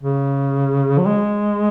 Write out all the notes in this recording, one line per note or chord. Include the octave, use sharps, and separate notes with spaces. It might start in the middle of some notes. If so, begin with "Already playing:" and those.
C#3
F#3
G#3